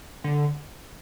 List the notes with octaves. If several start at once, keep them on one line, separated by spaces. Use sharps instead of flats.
D3